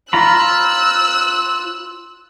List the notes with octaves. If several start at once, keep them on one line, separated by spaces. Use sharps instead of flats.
F4 A#5 B5 E6 F#6